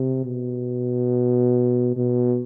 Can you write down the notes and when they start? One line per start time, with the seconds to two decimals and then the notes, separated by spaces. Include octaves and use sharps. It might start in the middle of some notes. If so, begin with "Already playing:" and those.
Already playing: C3
0.25 B2
1.96 B2